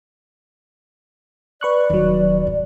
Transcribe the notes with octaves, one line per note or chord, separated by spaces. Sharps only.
B4 D5 C#6 F#6
D#1 D#3 F#3
G#2